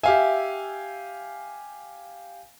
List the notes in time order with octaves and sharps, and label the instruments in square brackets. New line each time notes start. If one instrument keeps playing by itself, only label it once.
[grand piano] G4 F5 G#5 [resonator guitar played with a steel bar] E5